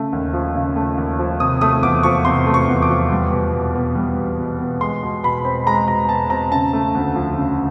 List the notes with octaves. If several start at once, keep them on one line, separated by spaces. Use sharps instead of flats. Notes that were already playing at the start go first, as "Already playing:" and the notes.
Already playing: C#3 A3
D#2
F3
C#3
A3
D#2
F3
C3 D#6
A3 D#6
E2 D6
F3 C#6
C3 C6
A3
C#6
E2
D6
F3
G3
B2
B2
B3
G3
B2
B2
B3
G#3 C6
B2
B2 B5
C4
G#3 A#5
B2 A#5
B2 A5
C4 A#5
C#3 A5
A3
D2
F3
C#3